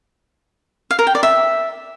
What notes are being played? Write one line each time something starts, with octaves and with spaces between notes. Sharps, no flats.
F5
A#4
G5
D5
E5